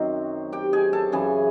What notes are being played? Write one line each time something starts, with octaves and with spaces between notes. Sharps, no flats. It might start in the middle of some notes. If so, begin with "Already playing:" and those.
Already playing: F#2 D#3 F#3 C4 C5
G4 G5
G#4 G#5
A4 A5
F#2 C#3 E3 G#4 G#5